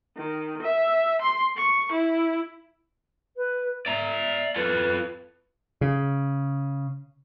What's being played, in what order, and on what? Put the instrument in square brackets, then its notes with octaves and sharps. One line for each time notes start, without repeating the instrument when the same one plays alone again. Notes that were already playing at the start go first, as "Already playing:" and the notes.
[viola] D#3
E5
C6
C#6
E4
[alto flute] B4
[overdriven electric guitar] D5 A#5 [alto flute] E5
[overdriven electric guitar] F4 A4 [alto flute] B4
[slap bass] C#3